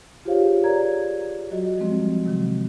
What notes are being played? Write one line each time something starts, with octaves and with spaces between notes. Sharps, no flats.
F4 G4 G#4 C5 C#5 F5
G#4 A#4 C#5 D5 A#5 G#6
F#3 F#4 D#5
F3 G3 G#3 C4
C3 D#3 F#3